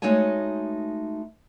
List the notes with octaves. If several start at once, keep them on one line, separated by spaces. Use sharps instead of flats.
G#3 A3 D#4 F#4 C#5 G#5